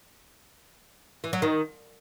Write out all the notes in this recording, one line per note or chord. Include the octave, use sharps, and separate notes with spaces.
E3
F#3
D#3